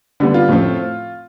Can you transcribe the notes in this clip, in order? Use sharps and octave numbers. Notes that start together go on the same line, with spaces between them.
D3 G3 B3
F4
A2 F3 A3 C4